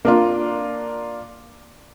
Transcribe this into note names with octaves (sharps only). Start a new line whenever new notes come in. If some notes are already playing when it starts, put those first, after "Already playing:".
A#3 D4 F4